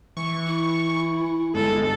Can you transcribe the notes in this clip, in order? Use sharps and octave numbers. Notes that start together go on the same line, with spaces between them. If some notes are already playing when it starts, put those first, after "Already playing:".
E3 C#6
E4
G1 G#3 A4